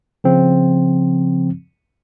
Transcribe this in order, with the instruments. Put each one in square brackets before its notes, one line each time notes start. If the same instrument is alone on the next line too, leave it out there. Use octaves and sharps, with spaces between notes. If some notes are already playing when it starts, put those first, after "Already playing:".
[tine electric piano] C#3 F3 C4